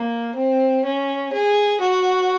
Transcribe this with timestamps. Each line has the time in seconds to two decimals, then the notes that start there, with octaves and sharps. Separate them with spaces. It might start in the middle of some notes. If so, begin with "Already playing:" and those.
Already playing: A#3
0.35 C4
0.85 C#4
1.33 G#4
1.81 F#4